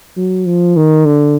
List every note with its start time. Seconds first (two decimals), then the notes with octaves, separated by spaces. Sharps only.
0.17 F#3
0.45 F3
0.76 D#3
1.06 D3